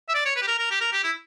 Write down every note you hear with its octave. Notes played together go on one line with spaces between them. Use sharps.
E5
D5
C#5
B4
G4
A#4
A#4
G4
A#4
G4
E4